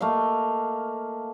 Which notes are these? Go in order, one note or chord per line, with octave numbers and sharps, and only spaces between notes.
A3 A#3 D#5 F5